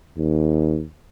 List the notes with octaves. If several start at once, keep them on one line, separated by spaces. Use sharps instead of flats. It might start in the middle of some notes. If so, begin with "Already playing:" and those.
D#2